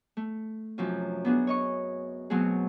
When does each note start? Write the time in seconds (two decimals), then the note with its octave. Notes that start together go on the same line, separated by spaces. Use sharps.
0.17 A3
0.78 F#2 C3 F3 C#4
1.25 B3 D4 F#4 G#4
1.47 C#5 D#5 C#6
2.30 B2 F#3 A3 C4 G#4